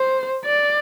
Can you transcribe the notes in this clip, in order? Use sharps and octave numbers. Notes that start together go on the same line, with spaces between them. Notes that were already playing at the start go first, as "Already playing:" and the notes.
Already playing: C5
D5